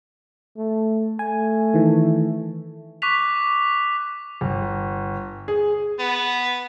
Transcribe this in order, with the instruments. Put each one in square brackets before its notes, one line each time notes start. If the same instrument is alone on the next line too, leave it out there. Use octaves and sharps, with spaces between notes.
[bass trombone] A3
[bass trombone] A3 [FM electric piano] G#5
[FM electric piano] D#3 E3
[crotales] C#6 D6 F#6 B6 F7
[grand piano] G1
G#4
[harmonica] B3